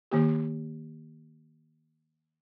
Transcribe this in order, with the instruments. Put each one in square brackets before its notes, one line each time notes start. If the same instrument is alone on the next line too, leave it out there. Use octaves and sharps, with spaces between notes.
[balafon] D#3 A#3 G4